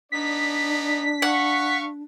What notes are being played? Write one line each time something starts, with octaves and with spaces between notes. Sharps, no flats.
B3 D4 D#4 D5 B6
F5 F#5 C#6